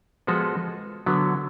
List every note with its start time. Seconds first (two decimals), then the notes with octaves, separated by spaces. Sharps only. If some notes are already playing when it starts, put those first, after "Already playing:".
0.27 F3 G#3 B3 F#4 A4
1.06 D3 F#3 B3